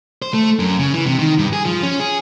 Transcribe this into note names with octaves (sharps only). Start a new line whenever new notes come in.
C5
A3
F#2
C#3
E3
C3
D#3
G2
G#4
F3
C#4
G#4